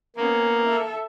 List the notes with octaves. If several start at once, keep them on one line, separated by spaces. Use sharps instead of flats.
A#3 B3 C#4
A4 E5